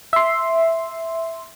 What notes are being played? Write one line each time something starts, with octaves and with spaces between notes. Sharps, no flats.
E5 C6